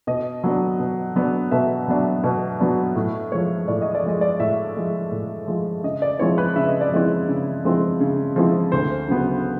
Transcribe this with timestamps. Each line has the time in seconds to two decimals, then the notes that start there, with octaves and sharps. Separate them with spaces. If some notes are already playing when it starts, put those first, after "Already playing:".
0.07 B2 D#5
0.44 F#3 B3 D4
0.79 B2
1.16 F#3 B3 D4
1.51 B2 E5
1.88 F#3 B3 D4
2.24 B2
2.60 F#3 B3 D4
2.96 A2
3.32 F3 G#3 C#5
3.68 A2 D5
3.81 D#5
3.95 D5
4.03 F3 G#3 D#5
4.21 D5
4.40 A2 E5
4.76 F3 G#3
5.12 A2
5.47 F3 G#3
5.84 C#3 D#5
6.02 D5
6.19 F3 G#3 C4 E4 C#5
6.38 B4
6.56 C#3 E5
6.68 D#5
6.81 D5
6.92 F3 G#3 C4 E4 D#5
7.28 C#3
7.65 F3 G#3 C4 E4
8.00 C#3
8.36 F3 G#3 C4 E4
8.72 D2 C5
9.08 C#3 F#3 B3